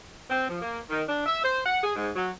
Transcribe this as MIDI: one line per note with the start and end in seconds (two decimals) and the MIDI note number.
0.30 0.46 60
0.49 0.61 53
0.62 0.79 58
0.90 1.03 51
1.09 1.24 62
1.26 1.42 76
1.44 1.61 72
1.66 1.82 78
1.83 1.92 68
1.96 2.09 44
2.16 2.31 54